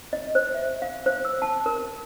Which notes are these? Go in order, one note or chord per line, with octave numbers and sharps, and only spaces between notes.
D#5
C5
E5
F5
C5
E6
A5
A#4